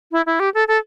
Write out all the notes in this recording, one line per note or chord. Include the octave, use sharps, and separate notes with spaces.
E4
E4
G4
A4
A4